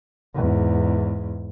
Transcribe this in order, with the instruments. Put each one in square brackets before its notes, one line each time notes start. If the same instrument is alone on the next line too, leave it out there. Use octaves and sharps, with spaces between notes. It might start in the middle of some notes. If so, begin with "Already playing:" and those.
[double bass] E2 G#2